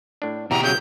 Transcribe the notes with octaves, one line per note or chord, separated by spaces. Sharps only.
A2 D4
E2 B2 G4 A#5
C#3 F#3 G6